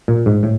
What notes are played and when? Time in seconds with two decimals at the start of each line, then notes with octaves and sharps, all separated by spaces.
0.08 A#2
0.26 G#2
0.43 A2